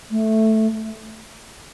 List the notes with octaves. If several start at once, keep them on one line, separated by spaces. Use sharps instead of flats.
A3